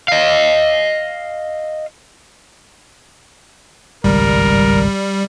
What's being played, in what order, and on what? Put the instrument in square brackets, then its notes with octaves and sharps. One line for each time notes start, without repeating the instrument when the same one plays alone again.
[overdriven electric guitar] D#5 F5
[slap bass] G#1 C#2 G2 [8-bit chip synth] G3 [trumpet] A#4